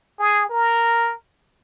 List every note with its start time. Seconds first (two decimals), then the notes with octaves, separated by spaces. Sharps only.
0.19 G#4
0.50 A#4